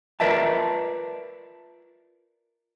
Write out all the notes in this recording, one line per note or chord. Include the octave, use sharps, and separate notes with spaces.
F4 A#4 B4 D5 E5 A5